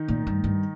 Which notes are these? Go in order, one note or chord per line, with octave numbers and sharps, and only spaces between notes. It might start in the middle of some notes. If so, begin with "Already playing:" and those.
Already playing: D#3 D#4
A#2
G2
G2